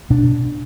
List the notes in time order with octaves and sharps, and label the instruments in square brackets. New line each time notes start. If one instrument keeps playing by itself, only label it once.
[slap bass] B2 D4